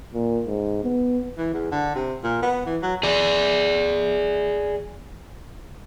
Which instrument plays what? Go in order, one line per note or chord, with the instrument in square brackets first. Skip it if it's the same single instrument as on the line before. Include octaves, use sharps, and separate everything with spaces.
[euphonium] A#2
G#2
B3
[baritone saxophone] E3
E2
D3
C3
A#2
B3
E3
F#3
[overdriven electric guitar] G#4 D5